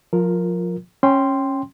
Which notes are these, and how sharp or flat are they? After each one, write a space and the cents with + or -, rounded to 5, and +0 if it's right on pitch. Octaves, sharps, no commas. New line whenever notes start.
F3 +30 F4 +0 A#4 +0
C#4 -15 G5 +0 C6 +0